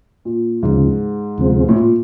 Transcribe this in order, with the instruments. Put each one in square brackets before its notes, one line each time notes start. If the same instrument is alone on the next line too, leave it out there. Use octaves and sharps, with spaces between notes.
[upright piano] A#2
[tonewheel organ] D2 C#3 F3 [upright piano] G#2
[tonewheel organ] D2 C3 F3 G#3 C4
[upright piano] A2
A#2